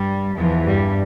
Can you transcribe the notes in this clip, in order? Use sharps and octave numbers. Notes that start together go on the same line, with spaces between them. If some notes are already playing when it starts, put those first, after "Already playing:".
Already playing: G2 G3
E2 E3 F3
G2 G3